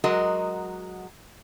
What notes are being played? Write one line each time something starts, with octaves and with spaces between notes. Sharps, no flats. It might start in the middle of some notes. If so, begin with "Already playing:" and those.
F#3 G#3 F#4 A#4 D#5